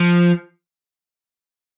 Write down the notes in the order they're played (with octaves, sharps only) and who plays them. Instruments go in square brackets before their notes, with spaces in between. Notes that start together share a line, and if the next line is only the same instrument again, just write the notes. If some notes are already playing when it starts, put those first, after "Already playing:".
Already playing: [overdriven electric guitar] F3